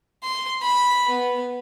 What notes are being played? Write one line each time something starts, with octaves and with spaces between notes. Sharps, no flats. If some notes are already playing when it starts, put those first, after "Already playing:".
C6
B5
B3